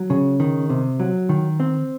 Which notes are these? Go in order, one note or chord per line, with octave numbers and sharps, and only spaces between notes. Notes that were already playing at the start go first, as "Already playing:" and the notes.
Already playing: F#3
C#3
D#3
C3
F#3
D#3
C4